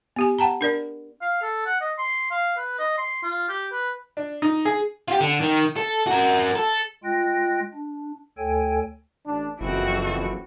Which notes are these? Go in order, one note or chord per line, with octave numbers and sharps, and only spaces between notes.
B3 G4 G#5
F#5 G5 A5 A#5
D4 A#4 D5
F5
A4
F#5
D#5
C6
F5
B4
D#5
C6
F4
G4
B4
D4
D#4
G#4
F4 G4
D3
D#3
A4
F#4 A#4
A4
G#3 F4 G5 F#6 A#6
D4
D2 A4 C#5 G5 G#5
A1 D4
F#1 F2 E3 C4 E4 F#4